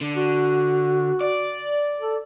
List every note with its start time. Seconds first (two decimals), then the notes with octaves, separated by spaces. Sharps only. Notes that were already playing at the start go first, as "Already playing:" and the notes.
0.01 D3
0.16 F#4
1.20 D5
2.00 A4